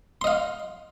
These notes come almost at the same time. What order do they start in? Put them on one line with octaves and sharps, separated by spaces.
C6 D#5 F5